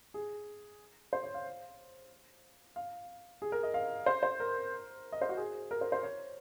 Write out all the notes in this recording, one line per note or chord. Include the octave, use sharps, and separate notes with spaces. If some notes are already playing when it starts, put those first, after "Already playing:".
G#4
C5
C#5
F5
F5
G#4
A#4
D#5
F5
C5
C5
A#4
D#5
C5
F#4
G#4
A#4
C5
C5
C#5